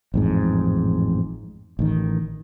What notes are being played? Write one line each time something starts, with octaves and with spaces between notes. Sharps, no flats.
A1 F2 G#2
A1 D#3